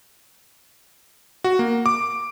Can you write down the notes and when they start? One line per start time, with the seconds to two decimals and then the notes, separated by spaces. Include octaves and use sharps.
1.44 F#4
1.59 A#3
1.86 D6